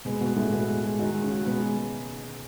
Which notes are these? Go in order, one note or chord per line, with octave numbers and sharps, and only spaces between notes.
B2 G#3 B3
B2 B3 F#4
A2 G#3 A3
B2 B3 F#4
G#3
G#3
D#3 D#4 F#4
G#3
C#3 C#4
F#4
B2 G#3 B3